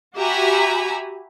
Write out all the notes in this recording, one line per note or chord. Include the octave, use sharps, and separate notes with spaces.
F#4 G4 E5 G#5 A#5 B5